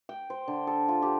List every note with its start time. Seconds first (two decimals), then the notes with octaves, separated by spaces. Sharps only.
0.09 G5
0.30 C5
0.48 D3
0.67 A4
0.89 F4
1.02 G4